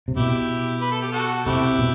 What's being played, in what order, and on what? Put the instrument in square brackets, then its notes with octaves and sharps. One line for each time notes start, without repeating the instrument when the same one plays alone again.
[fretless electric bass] C3
[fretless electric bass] B2 [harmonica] E4 G4
[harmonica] B4
A4
G4
F#4 A4
[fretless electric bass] C3 [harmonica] E4 G4
[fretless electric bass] B2